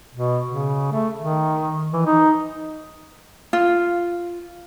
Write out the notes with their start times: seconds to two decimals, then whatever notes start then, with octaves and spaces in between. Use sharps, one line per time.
0.15 B2
0.48 C#3
0.92 A3
1.18 D#3
1.93 E3
2.06 D#4
3.53 F4